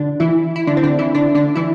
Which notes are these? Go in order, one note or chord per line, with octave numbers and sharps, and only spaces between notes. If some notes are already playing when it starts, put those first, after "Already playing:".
Already playing: D3 D4
E3 E4
E4
D3 D4
C4
D3 D4
E3 E4
D3 D4
D3 D4
E3 E4